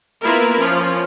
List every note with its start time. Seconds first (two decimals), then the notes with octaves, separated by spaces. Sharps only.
0.23 A#3 B3 E4 F4 A#4 B4
0.58 F3 C#4 F4